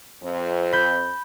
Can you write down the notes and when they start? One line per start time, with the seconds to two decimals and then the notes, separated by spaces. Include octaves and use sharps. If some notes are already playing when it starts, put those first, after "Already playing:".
0.23 F2 C4
0.72 B5 G6